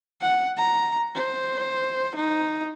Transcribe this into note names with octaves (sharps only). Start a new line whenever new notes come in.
F#5
A#5
C5
D#4